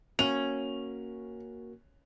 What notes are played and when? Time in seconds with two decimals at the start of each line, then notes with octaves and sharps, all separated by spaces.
0.19 A#3 C#4 F#4 A#4 F7